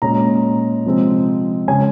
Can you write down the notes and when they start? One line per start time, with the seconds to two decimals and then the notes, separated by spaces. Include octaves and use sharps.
0.02 A#2 G#3 C#4 A#5
0.84 C3 F3 G#3 C4
1.68 C#3 G#3 C#4 G#5